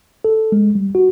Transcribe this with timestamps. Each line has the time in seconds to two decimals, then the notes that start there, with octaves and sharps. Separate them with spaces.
0.25 A4
0.52 G#3
0.75 G3
0.95 F#4